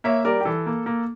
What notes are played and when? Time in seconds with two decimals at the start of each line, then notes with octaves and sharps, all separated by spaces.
0.04 A#3 C#5 E5
0.25 G3 A#4 D5
0.41 G4
0.45 E3 A4
0.66 A#3
0.86 A#3